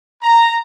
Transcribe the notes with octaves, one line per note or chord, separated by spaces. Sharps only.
A#5